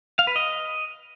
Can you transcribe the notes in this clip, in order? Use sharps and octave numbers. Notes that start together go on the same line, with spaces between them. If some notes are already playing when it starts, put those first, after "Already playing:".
F5
B4
D#5